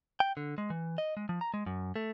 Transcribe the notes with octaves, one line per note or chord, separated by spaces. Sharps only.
G5
D3
G#3
E3
D#5
G#3
F3
A#5
G#3
F#2
A3